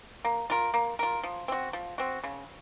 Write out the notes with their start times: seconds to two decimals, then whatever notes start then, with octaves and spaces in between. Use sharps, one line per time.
0.25 A#3
0.50 F4 A#4
0.74 A#3
0.99 F4 A#4
1.23 F3
1.48 C4 F#4
1.73 F3
1.98 C4 F#4
2.24 C#3